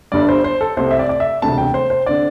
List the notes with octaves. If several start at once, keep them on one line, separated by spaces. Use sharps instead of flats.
G1 G2 G3 D5
C5
C5
A4
C2 C3 A3 C5
E5
D5
D5
E5
E1 D2 C3 A3 A5
G5
C5
C5
D3 C4 D5